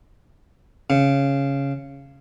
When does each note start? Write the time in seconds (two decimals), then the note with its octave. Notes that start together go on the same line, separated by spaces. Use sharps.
0.90 C#3